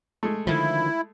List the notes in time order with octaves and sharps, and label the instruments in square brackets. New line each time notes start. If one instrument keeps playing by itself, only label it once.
[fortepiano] G#3 A3
[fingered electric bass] D3 D#3 F3 [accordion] E4